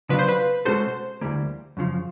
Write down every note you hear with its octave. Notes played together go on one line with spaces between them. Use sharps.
C#3 F#3 B3 D4 F4 B4
C5
B4
B2 G#3 C#4 F#4 A4 C5
D2 C3 E3 G3 A#3
F#2 C#3 F3